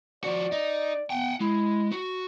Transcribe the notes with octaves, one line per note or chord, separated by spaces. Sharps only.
F3 F#4 D5
D#4
B3 F#5 G5
G#3 E4
F#4